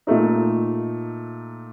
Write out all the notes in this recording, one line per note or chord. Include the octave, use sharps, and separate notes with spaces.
A#2 A3 D#4